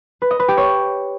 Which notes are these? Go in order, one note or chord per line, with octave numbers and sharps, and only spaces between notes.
B4
D#5
B4
G4
C#5